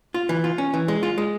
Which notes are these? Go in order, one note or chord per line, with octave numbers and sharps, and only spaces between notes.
F4
E3
F4
C#4
E3
G#3
F4
G#3